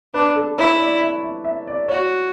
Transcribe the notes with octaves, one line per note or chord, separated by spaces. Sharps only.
D4 B4
A4
E4 C#5
D5
E5
E5
E5
D5
F#4 C#5